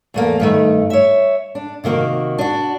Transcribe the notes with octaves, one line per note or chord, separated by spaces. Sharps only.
E2 A3 A#3
G2 D#3 A3
C#5 E5
D4
C3 D#3 A#3 F#4
D4 F#4